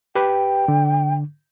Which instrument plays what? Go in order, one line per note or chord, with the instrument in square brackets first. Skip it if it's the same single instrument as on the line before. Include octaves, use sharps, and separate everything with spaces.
[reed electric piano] G4 B4 [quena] G5
[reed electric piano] D3